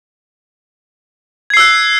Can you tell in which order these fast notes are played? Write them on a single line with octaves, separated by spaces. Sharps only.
G#6 C7 E6 F#6